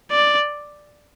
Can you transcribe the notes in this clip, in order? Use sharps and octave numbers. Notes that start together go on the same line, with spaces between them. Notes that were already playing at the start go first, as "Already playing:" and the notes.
D5